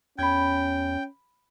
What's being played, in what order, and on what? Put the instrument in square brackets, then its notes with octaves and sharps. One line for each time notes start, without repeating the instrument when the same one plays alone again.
[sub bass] E2 [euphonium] C#4 [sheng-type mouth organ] G5 [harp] B5 G#6